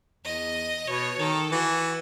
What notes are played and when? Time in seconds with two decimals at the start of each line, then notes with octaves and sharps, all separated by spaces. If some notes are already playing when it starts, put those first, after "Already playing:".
0.24 E2 D#5
0.87 B2 C#5
1.19 D#3 A4
1.51 E3 F#4